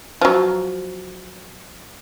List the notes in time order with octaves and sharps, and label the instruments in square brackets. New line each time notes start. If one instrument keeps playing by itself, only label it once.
[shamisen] F3 F#3